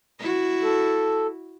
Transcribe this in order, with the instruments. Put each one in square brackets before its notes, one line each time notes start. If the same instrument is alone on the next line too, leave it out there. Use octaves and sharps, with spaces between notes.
[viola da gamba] E4 F#4
[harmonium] A4